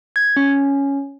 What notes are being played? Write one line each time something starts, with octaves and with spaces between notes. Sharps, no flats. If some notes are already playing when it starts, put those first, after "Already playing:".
G#6
C#4